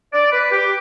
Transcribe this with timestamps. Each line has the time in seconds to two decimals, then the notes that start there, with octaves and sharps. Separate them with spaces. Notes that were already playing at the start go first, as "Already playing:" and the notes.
0.13 D5
0.32 B4
0.52 G4